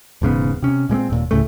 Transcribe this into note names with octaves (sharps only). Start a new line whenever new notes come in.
E1 G#2 C#3 B3
C3 C#4
A#2 G#3 A#3 C4
D#1 A#2
C#2 A2 C#3 A3